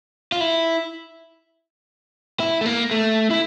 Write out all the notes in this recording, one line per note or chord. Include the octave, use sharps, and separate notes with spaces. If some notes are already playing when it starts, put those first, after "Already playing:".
F4
E4
E4
A3
A#3
A3
E4